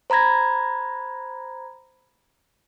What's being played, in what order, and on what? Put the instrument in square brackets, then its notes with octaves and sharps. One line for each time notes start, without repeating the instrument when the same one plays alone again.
[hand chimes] C5 A#5 B5 G#6 A#6